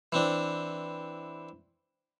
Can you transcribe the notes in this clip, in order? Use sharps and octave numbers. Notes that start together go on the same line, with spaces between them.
E3 C4 D4